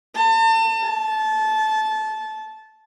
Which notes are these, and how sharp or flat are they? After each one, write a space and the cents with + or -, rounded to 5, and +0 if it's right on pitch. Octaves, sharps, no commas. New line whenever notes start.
A5 +35
A5 -20